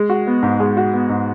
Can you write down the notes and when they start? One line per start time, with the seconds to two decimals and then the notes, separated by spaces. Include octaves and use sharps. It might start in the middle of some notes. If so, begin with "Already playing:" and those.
Already playing: G#3
0.10 F#4
0.27 B3
0.43 G#2
0.60 G#3
0.77 F#4
0.93 B3
1.09 G#2